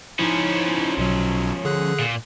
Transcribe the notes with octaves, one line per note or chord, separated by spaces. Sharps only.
F3 C#4 D#4 E4
B1 B2 F#3
D3 G#4 F#6
A#2